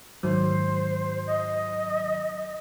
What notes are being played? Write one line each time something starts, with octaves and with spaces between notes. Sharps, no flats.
G#2 D#3 F#3 C5
D#5